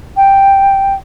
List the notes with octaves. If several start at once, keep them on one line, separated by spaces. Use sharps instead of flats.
G5